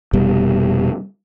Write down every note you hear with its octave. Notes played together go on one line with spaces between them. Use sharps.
F1 B2 G3